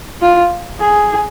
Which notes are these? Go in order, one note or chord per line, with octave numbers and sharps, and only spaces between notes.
F4
G#4